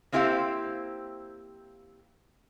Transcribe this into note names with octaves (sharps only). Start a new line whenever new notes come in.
A#3 C4 E4 G4 C5 F5